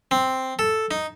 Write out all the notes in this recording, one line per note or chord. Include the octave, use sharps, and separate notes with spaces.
C4
A4
D#4